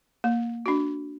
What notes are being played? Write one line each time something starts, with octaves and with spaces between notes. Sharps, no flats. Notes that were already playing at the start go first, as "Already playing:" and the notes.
A#3
D4 F#4